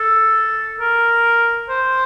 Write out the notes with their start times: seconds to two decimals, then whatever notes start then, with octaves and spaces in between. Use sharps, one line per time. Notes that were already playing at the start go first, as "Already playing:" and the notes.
Already playing: A4
0.80 A#4
1.69 C5